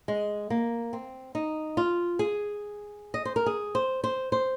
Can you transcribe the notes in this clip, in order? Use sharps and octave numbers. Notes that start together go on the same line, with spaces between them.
G#3
A#3
C4
D#4
F4
G#4
D#5
C5
A#4
G#4
C5
C5
C5